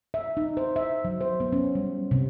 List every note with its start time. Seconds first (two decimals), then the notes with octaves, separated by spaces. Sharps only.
0.14 E5
0.37 D#4
0.57 C5
0.76 E5
1.05 F#3
1.21 C5
1.40 B3
1.53 C#4
1.75 G3
2.11 C3